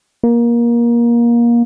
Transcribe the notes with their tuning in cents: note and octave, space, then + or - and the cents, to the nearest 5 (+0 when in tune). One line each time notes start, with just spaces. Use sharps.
A#3 +20